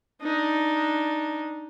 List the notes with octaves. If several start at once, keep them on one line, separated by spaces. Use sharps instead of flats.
D4 D#4